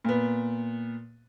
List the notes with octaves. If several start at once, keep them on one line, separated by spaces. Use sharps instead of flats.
A#2 B3